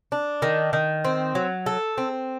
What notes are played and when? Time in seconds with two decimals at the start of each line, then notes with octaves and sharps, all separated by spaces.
0.12 D4
0.42 D#3
0.73 D#3
1.05 C4
1.35 F#3
1.66 A4
1.98 C4